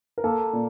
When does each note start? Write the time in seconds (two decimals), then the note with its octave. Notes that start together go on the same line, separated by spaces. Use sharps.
0.18 A#4
0.24 A#3 A4
0.53 A#2